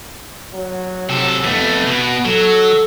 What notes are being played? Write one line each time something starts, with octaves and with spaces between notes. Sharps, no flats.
F#3
C3 A4
F2 A3 B3
B2
F#3 A4